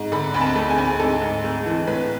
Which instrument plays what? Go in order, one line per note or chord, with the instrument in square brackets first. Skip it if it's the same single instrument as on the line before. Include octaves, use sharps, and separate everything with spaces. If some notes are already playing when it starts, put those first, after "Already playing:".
Already playing: [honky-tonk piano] G#2
D3 B5
D2 B5
A5
A3
G#5
D2
G#2 A4
G#2
A3
E3
A2 B4